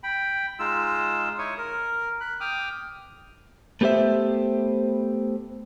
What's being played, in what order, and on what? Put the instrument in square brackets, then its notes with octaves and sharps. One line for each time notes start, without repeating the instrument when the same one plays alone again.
[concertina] G5 B5
G#3 D#4 F4 E6
D#4 E4 C#5 C#6 D#6
A#4
B5 F#6
G5 D6 D#6 F6
[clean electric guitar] A3 B3 G4 C5 E5